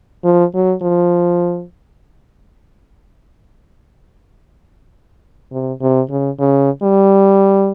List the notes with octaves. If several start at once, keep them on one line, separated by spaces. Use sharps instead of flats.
F3
F#3
F3
C3
C3
C#3
C#3
G3